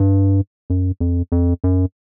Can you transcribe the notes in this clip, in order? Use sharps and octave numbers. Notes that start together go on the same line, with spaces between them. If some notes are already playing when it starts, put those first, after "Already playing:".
Already playing: G2
F#2
F2
F2
F#2